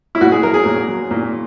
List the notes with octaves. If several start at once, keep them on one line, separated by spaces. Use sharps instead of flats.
E4
A#2 F#4
G#4
F#3 A#4
G#4
A#2
F#3
A#2